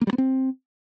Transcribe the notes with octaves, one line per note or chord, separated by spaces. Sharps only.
A#3
G3
B3
C4